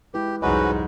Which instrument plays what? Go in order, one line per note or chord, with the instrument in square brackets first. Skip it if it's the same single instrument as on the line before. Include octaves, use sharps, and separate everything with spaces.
[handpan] G#3 E4 B4 [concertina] G4
[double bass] C2 F2 [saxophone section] G#2 [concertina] C#4 F#4 B4 [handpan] D#5 F#5